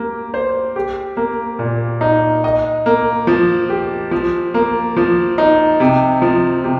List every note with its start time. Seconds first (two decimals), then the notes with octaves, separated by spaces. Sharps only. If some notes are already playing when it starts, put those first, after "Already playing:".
Already playing: A#3 G4
0.34 C5
0.76 G4
1.17 A#3
1.59 A#2
2.01 D#4
2.44 D#5
2.86 A#3
3.27 F3
3.69 G4
4.11 F3
4.54 A#3
4.96 F3
5.38 D#4
5.80 C3
6.22 F3
6.64 C3